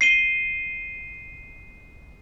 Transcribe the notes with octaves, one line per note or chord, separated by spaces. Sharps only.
C7 D#7 G7